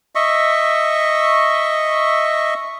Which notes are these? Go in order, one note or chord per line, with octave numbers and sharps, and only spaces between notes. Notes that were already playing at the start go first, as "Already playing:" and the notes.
D#5 E5 C#6